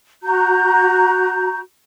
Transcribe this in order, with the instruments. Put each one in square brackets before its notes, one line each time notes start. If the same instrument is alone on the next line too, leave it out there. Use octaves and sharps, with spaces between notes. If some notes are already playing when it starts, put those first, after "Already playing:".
[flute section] F#4 A#5 G6